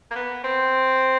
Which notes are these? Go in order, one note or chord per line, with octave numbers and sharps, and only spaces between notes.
A#3
B3
C4